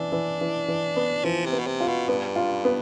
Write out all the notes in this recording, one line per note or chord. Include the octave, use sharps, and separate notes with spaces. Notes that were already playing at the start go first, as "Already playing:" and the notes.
Already playing: E3 D4
E3
E3
E3
B3
E3 F3
C3
B3
B2
C3
F4
B2
G2 B3
F4
B3